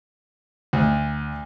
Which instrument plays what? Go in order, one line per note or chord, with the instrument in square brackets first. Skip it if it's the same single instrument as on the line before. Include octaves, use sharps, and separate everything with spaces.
[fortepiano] D2